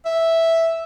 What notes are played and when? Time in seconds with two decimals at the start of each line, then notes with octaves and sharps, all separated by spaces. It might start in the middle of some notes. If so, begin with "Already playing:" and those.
0.06 E5